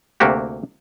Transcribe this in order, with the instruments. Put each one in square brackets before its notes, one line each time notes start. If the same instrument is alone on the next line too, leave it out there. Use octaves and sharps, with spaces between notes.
[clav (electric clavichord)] D2 C3 A#3 F#4 G4